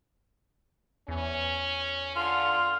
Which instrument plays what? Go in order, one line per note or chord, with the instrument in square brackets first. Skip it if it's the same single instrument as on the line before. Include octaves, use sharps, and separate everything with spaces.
[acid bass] E2 [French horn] C#4
[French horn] D3 [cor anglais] F4 [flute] C6